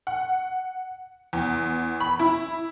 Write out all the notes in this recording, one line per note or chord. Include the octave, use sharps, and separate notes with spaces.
F#5
E2
B5
E4